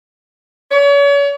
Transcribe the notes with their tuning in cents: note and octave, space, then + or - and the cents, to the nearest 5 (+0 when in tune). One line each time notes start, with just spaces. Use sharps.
C#5 +40